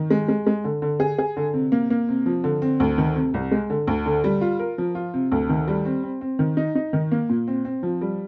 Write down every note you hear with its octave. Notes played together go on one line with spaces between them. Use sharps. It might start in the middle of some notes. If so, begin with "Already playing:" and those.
Already playing: D#3
G#3
G#3
G#3
D3
D3
G#4
G#4
D3
C3
A#3
A#3
C3
F3
D3
C4
D2
D#3
C3
C2
G#3
D3
D2
D3
G3
F4
A#4
F3
F4
C3
D2
D#3
G3
C4
C4
C4
D#3
D#4
D#4
D#3
A#3
A#2
C4
C4
F3
G3